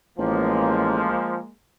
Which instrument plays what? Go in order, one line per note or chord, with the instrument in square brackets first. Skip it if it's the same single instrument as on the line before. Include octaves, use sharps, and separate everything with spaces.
[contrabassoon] A1 [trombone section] F3 [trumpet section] G#3 A#3